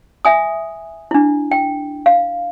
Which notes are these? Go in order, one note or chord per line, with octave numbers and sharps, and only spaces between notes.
E5 G#5 D#6
D4 E4
G5
F5